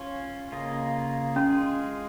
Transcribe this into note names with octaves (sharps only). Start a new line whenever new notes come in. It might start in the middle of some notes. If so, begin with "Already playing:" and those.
Already playing: C#4 F4 C#5
C#3 A#3 F4 G#4 D#5
G#3 C#4 F4 G#4